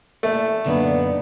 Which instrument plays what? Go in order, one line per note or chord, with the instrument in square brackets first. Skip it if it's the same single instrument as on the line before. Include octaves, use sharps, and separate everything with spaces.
[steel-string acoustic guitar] A#2 E3 [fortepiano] A3
[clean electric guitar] F#2 D3 [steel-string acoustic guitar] A#2 D4 D#4 [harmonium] B3